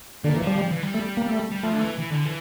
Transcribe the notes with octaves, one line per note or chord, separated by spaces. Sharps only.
A#2 D3
E3
F3 G3
F3
E3
G3
A3
A#3
A3
G3
F3 A3
D3
E3
E3
D3
E3